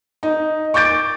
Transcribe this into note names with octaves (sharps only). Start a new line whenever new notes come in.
D#4
C#6 D6 G6 A6 D7